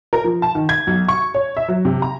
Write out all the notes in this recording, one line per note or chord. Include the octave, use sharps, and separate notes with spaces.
A#4
F3
A5
D#3
G#6
B1
C#6
C#5
E5
F#3
C3
A#5